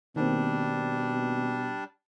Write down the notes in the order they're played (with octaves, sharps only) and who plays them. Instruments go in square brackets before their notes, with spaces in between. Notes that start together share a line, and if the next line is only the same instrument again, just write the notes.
[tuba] B2 [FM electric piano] D#3 A#3 C4 [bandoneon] G3 D4